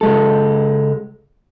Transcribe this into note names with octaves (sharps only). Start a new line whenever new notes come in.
C#2 G#3 A4